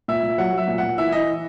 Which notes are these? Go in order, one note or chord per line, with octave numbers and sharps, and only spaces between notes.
A#2 E5
A#2
F#3 F#5
F#3 E5
A#2
A#2 F#5
E3 E5
E3 D#5